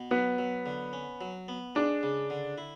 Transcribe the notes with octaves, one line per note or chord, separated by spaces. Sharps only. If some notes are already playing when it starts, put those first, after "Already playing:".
Already playing: B2
F#3 B3
F#3
D3
C#4
F#3
B3
G#3 D4
C#3
D3
E4